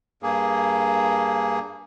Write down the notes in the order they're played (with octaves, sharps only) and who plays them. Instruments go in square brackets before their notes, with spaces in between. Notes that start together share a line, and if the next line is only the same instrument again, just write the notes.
[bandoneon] G2 A#3 G#4